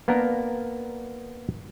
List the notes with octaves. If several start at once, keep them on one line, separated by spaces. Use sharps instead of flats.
A#3 B3 D4 A#4